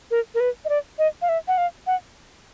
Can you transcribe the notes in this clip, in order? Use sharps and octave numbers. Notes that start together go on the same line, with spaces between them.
A#4
A#4
B4
D#5
D5
D#5
F5
E5
F#5
F5
F#5